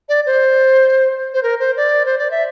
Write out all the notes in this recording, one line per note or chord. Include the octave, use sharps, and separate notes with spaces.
D5
C5
C5
A#4
C5
D5
C5
D5
E5